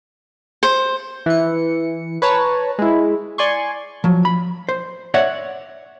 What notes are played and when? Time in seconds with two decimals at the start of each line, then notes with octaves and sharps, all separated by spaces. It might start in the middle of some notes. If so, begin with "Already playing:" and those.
0.63 C5
1.26 E3 C#7
2.22 B4 C#5 A5 A#5
2.79 G#3 E4
3.38 D5 G#5 C6 C#6
4.04 F3 F#3
4.25 B5
4.69 C5
5.14 C#5 D5 E5 F#5